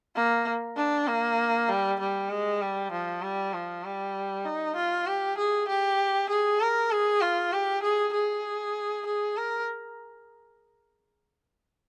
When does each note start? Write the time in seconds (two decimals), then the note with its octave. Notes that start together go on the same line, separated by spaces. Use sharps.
0.16 A#3
0.77 D4
1.07 A#3
1.69 G3
2.00 G3
2.30 G#3
2.61 G3
2.92 F3
3.22 G3
3.53 F3
3.84 G3
4.45 D#4
4.76 F4
5.06 G4
5.37 G#4
5.68 G4
6.29 G#4
6.61 A#4
6.91 G#4
7.21 F4
7.52 G4
7.83 G#4
8.13 G#4
9.06 G#4
9.37 A#4